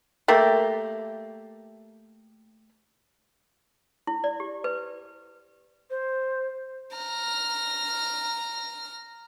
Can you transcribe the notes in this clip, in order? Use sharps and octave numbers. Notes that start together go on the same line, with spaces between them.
A3 A#3 G4
E4
D5
G4
B4
C5
A#5 F6